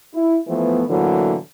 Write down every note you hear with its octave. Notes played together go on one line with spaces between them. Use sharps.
E4
E3 F3 A3 B3
A2 D3 E3 F#3 A#3